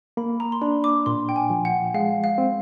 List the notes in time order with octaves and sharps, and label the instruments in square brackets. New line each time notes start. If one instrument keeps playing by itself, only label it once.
[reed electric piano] A#3 [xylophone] B5
[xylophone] A#5
C6
[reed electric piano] D4 [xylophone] B5
[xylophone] D6
[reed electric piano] A#2 [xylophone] C6
[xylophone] G5
G#5
[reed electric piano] F3
[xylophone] F#5
[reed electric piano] G#3 [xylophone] F5
[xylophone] F5
[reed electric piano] C4